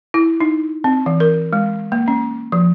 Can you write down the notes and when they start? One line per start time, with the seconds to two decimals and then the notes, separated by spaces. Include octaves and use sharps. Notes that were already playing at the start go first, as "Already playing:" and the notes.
0.14 E4
0.40 D#4
0.84 C4
1.06 E3
1.20 A#4
1.53 G#3
1.92 A#3
2.08 C#4
2.52 F3